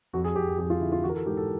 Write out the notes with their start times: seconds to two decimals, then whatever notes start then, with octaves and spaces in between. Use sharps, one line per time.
0.13 F2 F#4
0.24 G#4
0.35 F2 G4
0.47 G#4
0.58 F2 G4
0.70 F4
0.81 D3 E4
0.92 F4
1.03 E3 F#4
1.09 A#4
1.15 A4
1.26 G#2 G4
1.37 A4